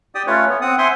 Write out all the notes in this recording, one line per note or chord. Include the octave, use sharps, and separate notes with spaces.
G4 D5 G5 D#6
A3 C#4 F4 B4 C#5
B3
C4 F#5 D#6
C5 E5 F#5 G#5 C6